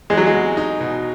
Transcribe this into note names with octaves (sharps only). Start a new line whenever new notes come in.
E2 G#3
F#3
G#3
E2
D#4
B2